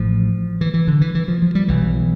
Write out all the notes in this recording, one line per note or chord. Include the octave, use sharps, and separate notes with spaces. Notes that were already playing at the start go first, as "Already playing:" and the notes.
Already playing: A1 A2 F3
E3
E3
D3
E3
E3
F3
F3
G3
B1 B2 E3
E3